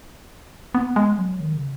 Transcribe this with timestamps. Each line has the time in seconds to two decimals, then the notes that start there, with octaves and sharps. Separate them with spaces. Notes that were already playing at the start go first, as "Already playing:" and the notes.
0.75 B3
0.96 G#3
1.18 F#3
1.40 D#3
1.55 C#3